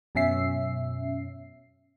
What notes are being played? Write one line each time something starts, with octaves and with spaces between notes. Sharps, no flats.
F#2 B2 C#4 E5 C7